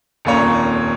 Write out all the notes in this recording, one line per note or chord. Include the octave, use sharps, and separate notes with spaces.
D#1 F2 A#2 C#4 C#5 A#5